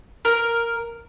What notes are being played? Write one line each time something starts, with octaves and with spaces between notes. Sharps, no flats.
A#4